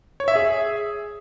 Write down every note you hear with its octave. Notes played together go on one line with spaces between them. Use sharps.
C#5
E5
G#4